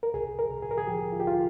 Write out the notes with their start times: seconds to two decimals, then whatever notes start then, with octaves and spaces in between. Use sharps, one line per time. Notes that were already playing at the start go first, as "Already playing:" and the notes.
0.03 A#4
0.14 C2 G#4
0.39 A#4
0.50 C2
0.62 G#4
0.71 A#4
0.78 G#4
0.87 F3 G4
1.12 F4
1.20 G4
1.24 C2 F4